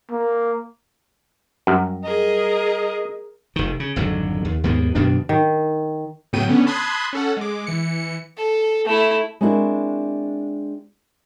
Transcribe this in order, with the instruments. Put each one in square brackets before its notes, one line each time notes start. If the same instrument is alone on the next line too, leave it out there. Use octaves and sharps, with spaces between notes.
[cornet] A#3
[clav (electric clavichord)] F#2 [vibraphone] G3
[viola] G#4 A#4 [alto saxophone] D#5
[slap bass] F1 D#3
C#3
G#1 F2 D3 F#3
D#2
D#2 G#2 A#3 B3
F#2 B2 D#3 D4
[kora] D#3
[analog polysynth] A2 C#3 F#3 B3 G5 D#7
D3 B3 C#4
A5 B5 C6 D#6 F#6 G#6
C#4 A4 F#5
G#3 D6
E3 C#7
[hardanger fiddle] A4
A3 E4
[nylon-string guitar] G#3 C4 D4 E4 F#4 A#4